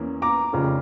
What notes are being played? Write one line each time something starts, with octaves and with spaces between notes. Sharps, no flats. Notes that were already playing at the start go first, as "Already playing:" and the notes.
Already playing: E2 E3 A#3 C#4
A#5 D6
F1 F2 C#3 F3